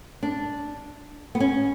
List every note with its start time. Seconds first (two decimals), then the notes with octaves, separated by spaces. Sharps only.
0.23 D4
1.35 B3
1.40 C#4